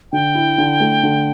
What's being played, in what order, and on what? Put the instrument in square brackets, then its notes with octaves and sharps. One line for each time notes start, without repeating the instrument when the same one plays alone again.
[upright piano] D3 [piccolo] G5
[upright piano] E4
D3
A3
D3